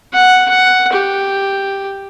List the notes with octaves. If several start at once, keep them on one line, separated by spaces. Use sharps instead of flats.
F#5
F#5
G4